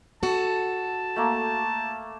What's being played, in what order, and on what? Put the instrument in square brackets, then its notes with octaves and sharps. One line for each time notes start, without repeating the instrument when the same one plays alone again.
[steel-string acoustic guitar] F#4 A4 [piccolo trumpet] A5
[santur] A3 A#3